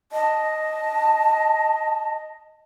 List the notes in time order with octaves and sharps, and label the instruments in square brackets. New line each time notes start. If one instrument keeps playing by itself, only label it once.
[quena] D#5 [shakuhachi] A5